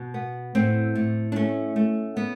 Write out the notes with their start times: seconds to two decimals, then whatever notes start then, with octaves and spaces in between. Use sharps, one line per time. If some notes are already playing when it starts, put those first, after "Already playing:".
Already playing: B2
0.14 B3
0.55 A2 C4
0.95 A2
1.32 D4
1.36 A3 C#4
1.76 A3
2.17 B3